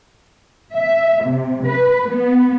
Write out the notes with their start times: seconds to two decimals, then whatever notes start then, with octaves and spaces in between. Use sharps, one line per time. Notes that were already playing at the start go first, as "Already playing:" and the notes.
0.73 E5
1.25 C3
1.65 B4
2.09 B3